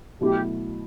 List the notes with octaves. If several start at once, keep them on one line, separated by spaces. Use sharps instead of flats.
B2 F#3 A3 E4 G4